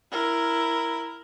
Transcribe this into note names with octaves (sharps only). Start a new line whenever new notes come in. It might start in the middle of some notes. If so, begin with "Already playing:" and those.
E4 A#4